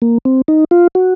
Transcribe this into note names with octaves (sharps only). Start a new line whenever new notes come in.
A#3
C4
D#4
F4
F#4